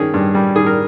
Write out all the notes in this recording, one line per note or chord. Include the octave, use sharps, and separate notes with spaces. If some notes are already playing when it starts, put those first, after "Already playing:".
Already playing: D#3 C#4 G#4
G2
G3
D#3 G#4
A#4